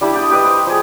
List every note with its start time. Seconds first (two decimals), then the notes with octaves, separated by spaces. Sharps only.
0.01 G3 D4 E4 G4
0.14 D5 G5 D#6
0.30 G4 B4 D5 D#5
0.44 G4 C5
0.67 F3 G#4